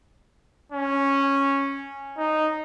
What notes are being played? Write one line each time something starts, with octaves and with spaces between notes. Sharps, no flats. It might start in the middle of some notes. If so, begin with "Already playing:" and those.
C#4
D#4